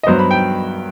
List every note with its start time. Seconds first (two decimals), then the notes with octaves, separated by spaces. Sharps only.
0.03 D#5
0.07 G2 F#3 B3 C5
0.19 B5
0.31 G5